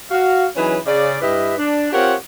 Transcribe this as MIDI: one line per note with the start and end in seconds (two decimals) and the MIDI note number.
0.11 0.47 66
0.11 0.47 77
0.56 0.77 52
0.56 0.77 54
0.56 0.77 61
0.56 0.77 63
0.56 0.77 68
0.56 0.77 71
0.86 1.17 49
0.86 1.17 74
1.22 1.54 43
1.22 1.54 64
1.22 1.54 67
1.22 1.54 71
1.22 1.54 75
1.22 1.54 76
1.57 1.90 62
1.93 2.15 60
1.93 2.15 65
1.93 2.15 67
1.93 2.15 70
1.93 2.15 73
1.93 2.15 78